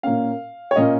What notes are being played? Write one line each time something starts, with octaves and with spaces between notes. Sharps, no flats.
A#2 A#3 C#4 F5
C#5
A#2 A#3 C#4 D#5